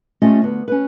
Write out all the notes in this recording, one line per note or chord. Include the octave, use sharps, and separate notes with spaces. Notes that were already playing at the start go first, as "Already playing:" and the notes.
A3 C#4 F4 G4 D#5
D2 B3
C#4 B4